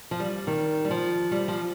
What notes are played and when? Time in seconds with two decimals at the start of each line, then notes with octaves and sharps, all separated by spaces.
0.11 F3
0.20 G3
0.47 D#3
0.85 G3
0.91 F3
1.32 G3
1.48 F3